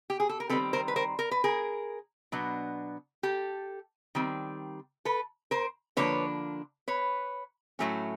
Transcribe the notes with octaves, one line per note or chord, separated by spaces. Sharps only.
G4
G#4
A4
A#4
D#3 G3 C4 A4 B4
A#4 C5
B4
A#4 C5
A#4
B4
G#4 A#4
B2 F#3 B3 D4
G4 A4
D#3 G3 C4
A4 B4
A#4 C5
D3 F3 A#3 D4 B4 C#5
B4 C#5
A2 F#3 A3 C#4